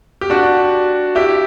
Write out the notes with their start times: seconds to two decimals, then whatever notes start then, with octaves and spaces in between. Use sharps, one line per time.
0.21 G4
0.30 D4 F#4
1.15 E4 G4